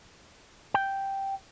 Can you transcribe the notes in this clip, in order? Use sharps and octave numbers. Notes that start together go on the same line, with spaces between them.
G5